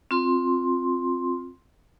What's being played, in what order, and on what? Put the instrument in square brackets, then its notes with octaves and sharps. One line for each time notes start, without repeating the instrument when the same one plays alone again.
[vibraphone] C4 F4 C6